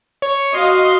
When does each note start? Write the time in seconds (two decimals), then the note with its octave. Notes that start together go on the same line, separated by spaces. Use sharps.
0.22 C#5
0.55 F#4 D#5 F5 C6